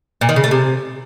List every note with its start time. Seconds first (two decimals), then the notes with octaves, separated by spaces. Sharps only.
0.21 A#2
0.29 D#3
0.36 C#3
0.44 A3
0.51 C3